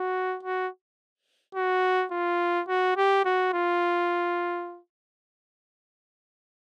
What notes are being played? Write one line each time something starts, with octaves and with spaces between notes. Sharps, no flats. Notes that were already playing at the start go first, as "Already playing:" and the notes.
Already playing: F#4
F#4
F#4
F4
F#4
G4
F#4
F4